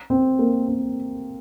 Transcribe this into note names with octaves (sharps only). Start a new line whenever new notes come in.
C4
A#3
C4